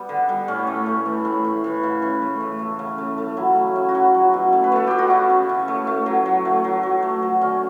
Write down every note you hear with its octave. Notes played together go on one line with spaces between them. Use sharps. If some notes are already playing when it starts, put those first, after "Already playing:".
Already playing: G3 B3
D3
G3
A2 C#4
A3
A3
E3
A2
A2
E3
C#3
E3
A3
A3
A3
C#3
A3
A3
F#3 E4
C#3
C#3
F#4
F#3 E4
F#3
B2
A3
B4
A3 A4
B2 G4
F#4
C#3 E4
C#3
C#3
A3
A3
F#3
F#3
A3
F#3
F#3
A3
F#3
D3 C#4